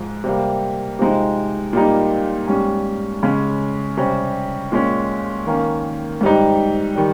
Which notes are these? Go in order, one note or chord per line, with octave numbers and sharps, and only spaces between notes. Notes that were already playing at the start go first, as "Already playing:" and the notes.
Already playing: G#2 F3 G#3
C3 G3 A#3
C3 F3 G#3 D#4
A#2 G3 A#3 D#4
G#2 G3 C#4
C#3 G#3 C#4
C3 G3 C#4
A#2 G#3 C#4
D#3 A#3 C#4
G#2 G3 C4 D#4
D#3 G3